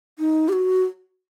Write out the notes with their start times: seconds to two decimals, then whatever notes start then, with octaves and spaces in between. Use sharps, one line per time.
0.19 D#4
0.49 G4
0.53 F#4